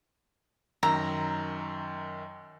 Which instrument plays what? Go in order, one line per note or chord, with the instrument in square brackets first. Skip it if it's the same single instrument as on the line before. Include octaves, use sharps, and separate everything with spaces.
[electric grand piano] F#2 D#3 E6 [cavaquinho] A#5